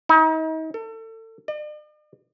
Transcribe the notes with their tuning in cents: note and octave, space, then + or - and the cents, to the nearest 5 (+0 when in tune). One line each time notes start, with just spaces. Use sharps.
D#4 +40
A4 +30
D5 +45